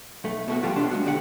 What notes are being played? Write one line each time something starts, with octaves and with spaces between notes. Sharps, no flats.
B1 A3
B2 A3 F#4
E3 F#3 G3 F4 G4 A4
B2 F3 C#4 D4 A4 C6
G#3 B3 F#4
E2 D3 G4 G#4 F#5